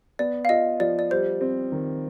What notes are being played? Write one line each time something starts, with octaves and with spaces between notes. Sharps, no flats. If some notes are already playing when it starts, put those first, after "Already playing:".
B3 D5
F5
F4 D#5
F3 D5
D5
G3 C5
C4
D#3